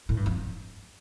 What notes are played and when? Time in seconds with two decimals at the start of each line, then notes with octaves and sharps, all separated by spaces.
0.09 A2
0.17 G2
0.26 F2